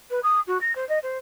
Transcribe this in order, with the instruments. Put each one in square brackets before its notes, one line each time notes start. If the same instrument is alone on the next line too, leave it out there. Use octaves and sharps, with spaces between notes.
[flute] B4
D#6
F#4
A#6
C5
D#5
C5